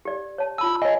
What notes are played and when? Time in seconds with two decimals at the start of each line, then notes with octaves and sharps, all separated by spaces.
0.05 G4 D5
0.38 C#5 A5
0.58 F4 A5 B5 E6
0.82 C#5 D#5 G#5